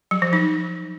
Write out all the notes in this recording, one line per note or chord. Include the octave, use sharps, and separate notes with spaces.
F#3
F3
D#4